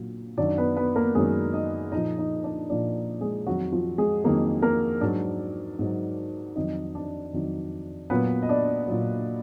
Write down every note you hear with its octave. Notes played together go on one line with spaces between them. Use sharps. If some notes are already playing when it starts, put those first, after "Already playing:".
Already playing: A#2 F#3
F#2 D#3 F#3 D4 D5
B3 B4
B3 B4
A#3 A#4
F#2 D#3 F#3 G#3 G#4
D#4 D#5
A#2 F3 D#4 D#5
D#4 D#5
D4 D5
A#2 F3 D4 D5
G#3 G#4
F2 D#3 F#3 F#4
F3 F4
G#3 G#4
F2 D#3 F#3 A#3 A#4
A#3 A#4
G#2 F#3 D4 D5
G#2 F#3
F2 D#3 F#3 D#4 D#5
D4 D5
F2 D#3 F#3
A#2 F#3 B3 B4
D#5
D4 D5
A#2 F#3